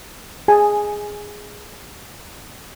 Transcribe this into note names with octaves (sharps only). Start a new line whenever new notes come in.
G#4 G#5 A5